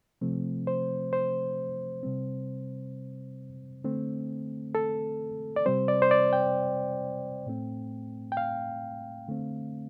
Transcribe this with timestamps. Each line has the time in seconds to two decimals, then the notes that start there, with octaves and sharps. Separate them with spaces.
0.21 C3 F3 A3 C4
0.67 C5
1.13 C5
2.03 C3 G3 C4
3.84 D3 A3 C4
4.75 A4
5.56 D5
5.66 C3 G3 C4 C5
5.88 D5
6.02 C5
6.11 D5
6.33 G5
7.46 A2 A3 C4
8.32 G5
8.37 F5
9.28 D3 A3 C4